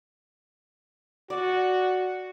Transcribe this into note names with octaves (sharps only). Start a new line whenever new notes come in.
F#4 D5